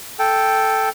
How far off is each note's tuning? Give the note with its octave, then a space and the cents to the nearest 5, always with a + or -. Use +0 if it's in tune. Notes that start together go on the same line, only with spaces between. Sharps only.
A4 +0 G5 +0